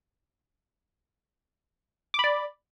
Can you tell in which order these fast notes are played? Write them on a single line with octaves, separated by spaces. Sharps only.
D6 B5 D5